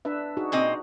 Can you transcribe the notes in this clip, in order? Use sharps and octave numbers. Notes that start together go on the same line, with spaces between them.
D4 B4 E5
D#4 F#4 G#4
A#2 C4 D#5